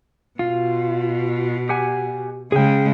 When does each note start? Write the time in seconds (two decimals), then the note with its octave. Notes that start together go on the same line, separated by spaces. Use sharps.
0.39 B2 F4
1.69 G4 F#5 G#5
2.52 C#3 G#3 G#4 G5